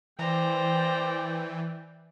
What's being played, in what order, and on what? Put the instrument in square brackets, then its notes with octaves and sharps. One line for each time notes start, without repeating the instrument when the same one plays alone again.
[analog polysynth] E3 [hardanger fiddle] C5 A#5 [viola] D5 G5